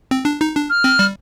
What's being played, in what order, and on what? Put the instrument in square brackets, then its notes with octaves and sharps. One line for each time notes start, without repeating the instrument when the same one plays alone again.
[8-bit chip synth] C4
D4
D#4
D4
[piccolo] F6
[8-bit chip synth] C4
G3